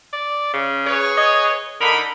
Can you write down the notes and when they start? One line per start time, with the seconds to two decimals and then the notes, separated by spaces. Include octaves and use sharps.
0.13 D5
0.54 C#3
0.86 G#4 B4 C#5
1.17 D#5
1.81 D3 D#4 A#4 B5